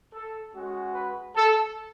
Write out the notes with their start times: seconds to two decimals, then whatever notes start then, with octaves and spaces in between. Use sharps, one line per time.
0.13 A4
0.54 G#3 C#4 F#4
0.94 B4
1.36 A4